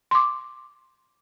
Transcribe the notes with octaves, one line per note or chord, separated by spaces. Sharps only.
C6 D6